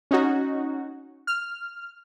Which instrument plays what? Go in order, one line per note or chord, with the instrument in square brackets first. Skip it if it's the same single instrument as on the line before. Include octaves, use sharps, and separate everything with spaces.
[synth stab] C#4 D#4 F#4
F6